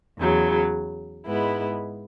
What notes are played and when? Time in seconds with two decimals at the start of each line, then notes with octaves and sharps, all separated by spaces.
0.18 E2 C#3 F#3
1.26 G#2 G#3 B3 E4